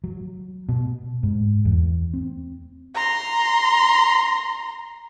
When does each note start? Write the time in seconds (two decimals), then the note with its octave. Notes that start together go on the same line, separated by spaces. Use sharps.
0.04 F#3
0.69 B2
1.23 G#2
1.65 E2
2.14 C4
2.95 A#5 C6